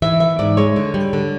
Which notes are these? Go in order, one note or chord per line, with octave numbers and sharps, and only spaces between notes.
E3 E5
B3 E5
G#2 D5
G#3 C#5
D3
G3
D3